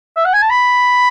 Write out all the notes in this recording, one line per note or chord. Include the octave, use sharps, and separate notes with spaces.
E5
F#5
G#5
A5
B5